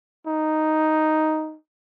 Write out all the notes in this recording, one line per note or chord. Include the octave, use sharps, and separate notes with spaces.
D#4